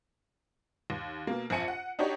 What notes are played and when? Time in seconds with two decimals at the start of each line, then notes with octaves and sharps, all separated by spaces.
0.90 D#2
1.27 B2 A#3
1.50 A#1 F2 G#5 C#7 D#7
1.68 F#5
1.99 D4 D#4 F#4 G4 C#5